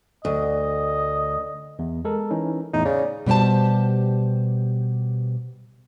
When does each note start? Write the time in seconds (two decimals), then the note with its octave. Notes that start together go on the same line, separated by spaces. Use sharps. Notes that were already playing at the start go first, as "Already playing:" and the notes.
0.25 D2 D#5
1.79 E2
2.05 G#3 A4 A#4
2.31 E3 C#4 D#4
2.73 E2 A2 D#4
2.85 C#3 D5
3.26 B2 G3 G4 C5 A5